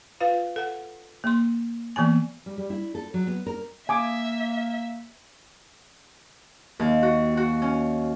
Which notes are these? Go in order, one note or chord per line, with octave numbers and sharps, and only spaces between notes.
F4 B4 F5
A4 F#5
A#3 C6
E3 A#3 B3 G#5
G3
G3
E4
A4
F#3
B3
A#4
A#3 E5 G#5 D6 D#6
D#2
F#4
F#4
C#4